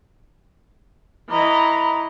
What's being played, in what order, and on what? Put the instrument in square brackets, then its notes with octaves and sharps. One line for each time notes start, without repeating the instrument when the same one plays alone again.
[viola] E3 D#5 [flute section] A#5 B5